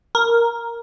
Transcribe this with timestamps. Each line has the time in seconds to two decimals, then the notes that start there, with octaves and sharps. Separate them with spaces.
0.15 A#4